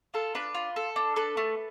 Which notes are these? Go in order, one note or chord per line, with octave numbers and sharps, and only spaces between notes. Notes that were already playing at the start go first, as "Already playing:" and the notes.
F4 A4
D4 B4
F4
A4
D4
A4 B4
A3